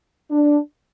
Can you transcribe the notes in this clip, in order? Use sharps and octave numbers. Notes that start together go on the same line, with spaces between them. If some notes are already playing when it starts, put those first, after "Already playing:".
D4